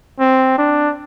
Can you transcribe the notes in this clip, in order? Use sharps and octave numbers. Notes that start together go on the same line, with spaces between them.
C4
D4